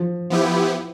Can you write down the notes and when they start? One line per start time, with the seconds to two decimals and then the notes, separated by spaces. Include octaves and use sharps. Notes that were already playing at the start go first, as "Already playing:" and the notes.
Already playing: F3
0.30 F3 B3 E4 G4